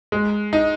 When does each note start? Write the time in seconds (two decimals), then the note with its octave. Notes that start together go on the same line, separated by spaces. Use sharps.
0.12 G#3
0.53 D#4